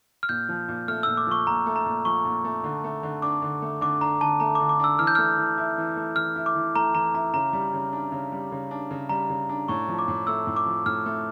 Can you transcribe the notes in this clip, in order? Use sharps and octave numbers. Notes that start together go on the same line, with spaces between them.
F6
A#2 G6
F3
A#2
A3 F6
A#2 E6
D6
F3 C#6
A#2 A#5
A3
A#5
A#2
F3 C#6
A#2
A3
D3
A3
D3
D4 D6
D3
A3
D3 D6
D4 A#5
D3 A5
A3 A#5
D3 D6
D6
D4 E6
E3 F6
G6
A3 F6
E3
E4
E3
A3
E3 F6
E4
D6
E3
A3 A#5
E3 A#5
E4 A#5
C#3 A#5
G3
C#3
D4
C#3
G3
C#3
D4
C#3
G3 A#5
C#3
D4
A2 C#6
F3
D6
A2
A3 E6
A2
D6
F3
A2 F6
A3